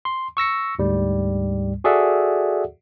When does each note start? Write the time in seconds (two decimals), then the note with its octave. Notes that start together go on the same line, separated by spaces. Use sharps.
0.05 C6
0.37 C#6 E6 A#6 C#7
0.79 D2 G#2 G3
1.84 F#4 G#4 A4 D5 E5 F#5